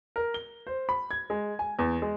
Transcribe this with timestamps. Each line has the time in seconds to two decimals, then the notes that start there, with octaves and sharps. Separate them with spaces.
0.16 A#4
0.34 G7
0.67 C5
0.89 B5
1.11 G#6
1.30 G#3
1.59 G#5
1.79 E2
2.02 G#3